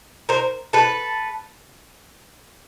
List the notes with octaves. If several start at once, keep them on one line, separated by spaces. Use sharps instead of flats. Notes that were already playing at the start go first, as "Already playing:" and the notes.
A#4 C5
A4 B4